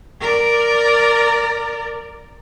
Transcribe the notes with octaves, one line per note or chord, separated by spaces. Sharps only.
A#4 D5